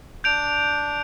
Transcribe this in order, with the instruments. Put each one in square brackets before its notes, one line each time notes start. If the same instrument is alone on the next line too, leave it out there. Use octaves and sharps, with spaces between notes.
[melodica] D4 [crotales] G6 D7 F7